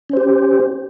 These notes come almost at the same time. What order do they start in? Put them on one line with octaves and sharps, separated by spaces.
C#4 C5 G4